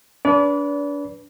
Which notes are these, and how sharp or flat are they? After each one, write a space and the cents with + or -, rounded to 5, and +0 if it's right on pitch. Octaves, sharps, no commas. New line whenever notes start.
D4 -30 B4 -15 D5 -35